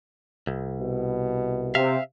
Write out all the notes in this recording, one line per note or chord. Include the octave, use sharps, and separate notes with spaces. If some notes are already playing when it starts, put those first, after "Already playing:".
C2
B2
C3 E5 F5